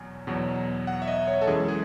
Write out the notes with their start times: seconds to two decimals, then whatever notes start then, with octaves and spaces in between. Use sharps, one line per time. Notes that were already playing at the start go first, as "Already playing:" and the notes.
Already playing: E2 B2 F#3 G#5
0.27 E2 B2 F#3
0.87 F#5
1.02 E5
1.08 D#5
1.28 C#5
1.42 A4
1.47 F#2 E3 G#3 G#4
1.68 G#4